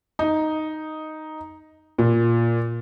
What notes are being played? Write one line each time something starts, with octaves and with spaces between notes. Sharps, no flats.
D#4
A#2